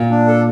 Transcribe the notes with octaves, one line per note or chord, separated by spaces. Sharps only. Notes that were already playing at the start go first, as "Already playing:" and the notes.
Already playing: A#2
D4
A4